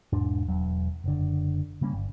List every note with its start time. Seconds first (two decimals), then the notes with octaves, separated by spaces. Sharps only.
0.13 E1 G#2 D4
0.48 E1 F#3
1.04 F#1 D3
1.81 C#3 G3 A#3 C#4
1.93 G1